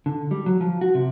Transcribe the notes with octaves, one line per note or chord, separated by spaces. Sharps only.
D3
G3
F#3
F3
F#4
C3